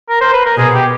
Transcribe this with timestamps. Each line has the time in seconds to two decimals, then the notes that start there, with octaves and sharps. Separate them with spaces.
0.09 A#4
0.21 C5
0.33 B4
0.46 A#4
0.58 B2 G#4
0.74 G4